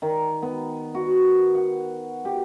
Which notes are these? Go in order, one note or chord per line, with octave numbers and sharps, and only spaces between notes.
D#3
B3
F#4
F#5
G4